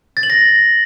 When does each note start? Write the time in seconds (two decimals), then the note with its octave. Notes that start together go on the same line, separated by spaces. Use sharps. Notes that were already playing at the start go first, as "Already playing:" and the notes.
0.17 A6
0.23 F#7
0.30 A#6